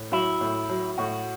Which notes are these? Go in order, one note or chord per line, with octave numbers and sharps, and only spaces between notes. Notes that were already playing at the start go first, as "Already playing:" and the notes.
Already playing: A2
F#3 E4
A2
F#3
A2 F#4